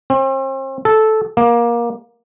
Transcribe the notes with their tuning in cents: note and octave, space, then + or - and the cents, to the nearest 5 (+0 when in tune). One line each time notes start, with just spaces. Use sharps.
C4 +40
A4 -10
A#3 +20